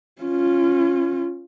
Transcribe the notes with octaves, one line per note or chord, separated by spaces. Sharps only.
C#4 F4